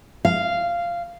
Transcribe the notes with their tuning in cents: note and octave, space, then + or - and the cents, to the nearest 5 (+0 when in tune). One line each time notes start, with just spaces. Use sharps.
F5 -10